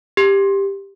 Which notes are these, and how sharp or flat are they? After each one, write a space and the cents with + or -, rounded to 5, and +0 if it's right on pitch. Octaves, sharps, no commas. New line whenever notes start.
G4 +10